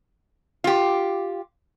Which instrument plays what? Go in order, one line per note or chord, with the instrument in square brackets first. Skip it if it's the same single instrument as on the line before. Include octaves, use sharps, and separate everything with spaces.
[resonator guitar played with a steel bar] F4 G4